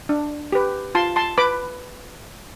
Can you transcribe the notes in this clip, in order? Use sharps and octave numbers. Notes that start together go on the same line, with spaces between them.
D4
G4 B4
F4 A5 C6
A5 C6
B4 B5 D6